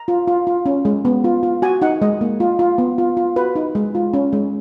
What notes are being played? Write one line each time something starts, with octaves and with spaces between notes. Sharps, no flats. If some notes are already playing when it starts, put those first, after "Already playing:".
Already playing: A#5
F4
F4
F4
C#4
G#3
B3
F4
F4
F#4 G#5
D#4 F#5
G#3 D#5
A#3
F4
F4
B3
F4
F4
F#4 B4
D#4
G#3
F4
C#4
G#3